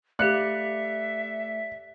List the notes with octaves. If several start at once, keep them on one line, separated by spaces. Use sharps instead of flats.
A3 G4 D5 E5 F5 F#6 C#7 F#7